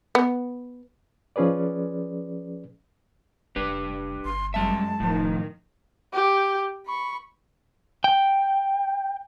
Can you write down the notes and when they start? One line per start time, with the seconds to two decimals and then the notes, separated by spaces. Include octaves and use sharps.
0.15 B3
1.36 F3 C#4 G#4 B4 D5
3.56 F1 D4 G4 B4
4.25 G1 C6
4.54 F#2 G3 G#3 E5 A5
5.00 D#1 A2 D#3 F3
6.13 G4
6.86 B5 C#6
8.04 G5